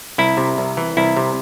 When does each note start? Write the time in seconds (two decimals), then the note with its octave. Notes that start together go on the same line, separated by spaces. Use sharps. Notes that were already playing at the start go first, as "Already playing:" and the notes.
0.18 C2 E4
0.37 C3
0.58 C2
0.77 E3
0.97 C2 E4
1.17 C3